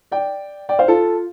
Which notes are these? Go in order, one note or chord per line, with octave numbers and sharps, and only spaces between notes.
D5 G5
D5 G5
C5 F5
F4 A4